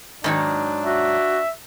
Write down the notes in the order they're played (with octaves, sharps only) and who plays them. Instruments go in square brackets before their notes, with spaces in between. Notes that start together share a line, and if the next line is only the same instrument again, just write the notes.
[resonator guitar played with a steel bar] G#2 D#3 F#3 [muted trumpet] D4
[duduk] F#4 [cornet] E5